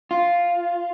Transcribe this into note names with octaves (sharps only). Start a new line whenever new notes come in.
F4